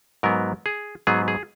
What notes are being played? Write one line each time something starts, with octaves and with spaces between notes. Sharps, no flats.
G#2 F#3 B3 A#4
G#4
G#2 F#3 B3 G#4
G#4